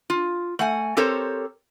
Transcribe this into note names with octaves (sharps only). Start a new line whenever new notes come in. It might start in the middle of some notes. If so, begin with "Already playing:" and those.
F4
A3 F#5 G#5
C4 G4 A4 A#4 C5 C#5